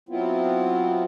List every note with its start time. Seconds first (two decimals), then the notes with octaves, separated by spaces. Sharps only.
0.09 F#3 B3 C4 E4 F4